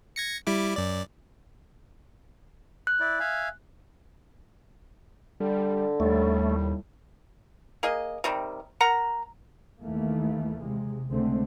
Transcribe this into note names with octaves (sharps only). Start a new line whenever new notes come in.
G#6 A#6 C#7
G3 E4 D6
F#2 D5
F#6
E4 D5
E5 F5 G#5
D3 G3
D#2 A2 G3 A3
A#3 G#4 D#5
C3 D#3 G3
A#4 F#5 A#5
D#2 D#3 E3 A3 A#3
C3 G#3
C#2 D3 G#3 A3 C4